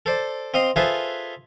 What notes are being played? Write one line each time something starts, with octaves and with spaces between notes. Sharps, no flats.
A4 C5 D5
C4 D#5 F5 C6
F4 G#4 A4 B4 C5 E5